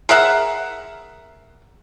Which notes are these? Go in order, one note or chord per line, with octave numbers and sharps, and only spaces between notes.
G#4 A#4 E5 F#5